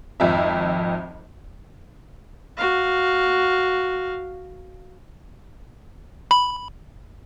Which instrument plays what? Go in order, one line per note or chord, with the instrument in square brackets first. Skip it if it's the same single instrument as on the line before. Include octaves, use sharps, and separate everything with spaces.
[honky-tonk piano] G#1 F2 F3 E5
[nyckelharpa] F#4 F5
[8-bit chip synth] B5